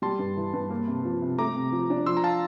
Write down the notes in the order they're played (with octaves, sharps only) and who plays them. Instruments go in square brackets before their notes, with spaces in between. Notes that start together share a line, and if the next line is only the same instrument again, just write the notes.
[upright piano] G3 [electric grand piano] A5 C6
[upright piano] G2
E3
G2
A#3
C3
F3
C3
[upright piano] A3 [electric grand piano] A#5 D6
[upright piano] C3
F3
D4
[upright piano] F3 [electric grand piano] C6 E6
[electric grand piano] A#5
F5 A5